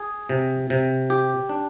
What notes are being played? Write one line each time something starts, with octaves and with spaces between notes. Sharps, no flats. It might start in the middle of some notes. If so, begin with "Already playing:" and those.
Already playing: G#4
C3
C3
G4
D4